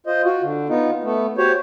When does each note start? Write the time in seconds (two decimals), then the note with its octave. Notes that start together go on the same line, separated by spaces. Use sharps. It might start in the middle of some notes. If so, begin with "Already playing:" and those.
0.06 F4 C5 D#5
0.25 F4 F#4
0.42 D3
0.69 B3 D#4 F4
1.03 A3 B3
1.38 F#4 G4 C5 C#5